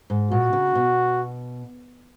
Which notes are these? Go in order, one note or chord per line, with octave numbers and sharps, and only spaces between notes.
G#2
A#2 F#4
C#3
B2